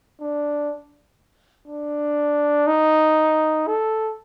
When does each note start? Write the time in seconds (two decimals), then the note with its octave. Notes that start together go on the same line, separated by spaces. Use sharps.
0.21 D4
1.68 D4
2.67 D#4
3.67 A4